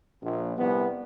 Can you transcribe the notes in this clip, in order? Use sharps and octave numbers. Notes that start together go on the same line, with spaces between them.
A#1
C2 B3